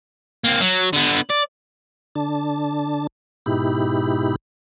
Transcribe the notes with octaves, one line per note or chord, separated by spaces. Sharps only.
A#3 C4
F#3
D3 B3
D5
D3 D4 A5
G#2 B2 D#4 E4 G4 B5